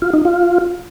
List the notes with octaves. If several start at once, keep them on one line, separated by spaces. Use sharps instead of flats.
F4
D#4
F4